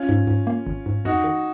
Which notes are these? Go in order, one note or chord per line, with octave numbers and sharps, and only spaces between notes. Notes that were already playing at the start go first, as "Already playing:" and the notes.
Already playing: C#4 F4
G#2
G#2
A#3
G#1
G#2
F2 D#4 F#4
D#3